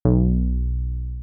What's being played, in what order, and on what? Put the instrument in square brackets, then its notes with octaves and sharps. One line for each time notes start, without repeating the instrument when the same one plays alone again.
[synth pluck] B1